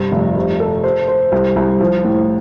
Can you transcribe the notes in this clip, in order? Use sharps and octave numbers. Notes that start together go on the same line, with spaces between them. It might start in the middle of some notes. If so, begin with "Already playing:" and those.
Already playing: G2 C3
F1
C3
A4
C5
C5
C2
C2
F3
A2